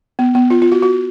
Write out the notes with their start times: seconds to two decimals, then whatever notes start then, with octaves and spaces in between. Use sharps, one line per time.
0.19 B3
0.35 B3
0.50 F4
0.62 F4
0.72 F#4
0.83 F#4